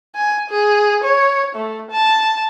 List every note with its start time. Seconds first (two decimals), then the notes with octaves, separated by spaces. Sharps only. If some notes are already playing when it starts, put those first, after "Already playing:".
0.15 G#5
0.50 G#4
1.04 C#5
1.55 A3
1.91 A5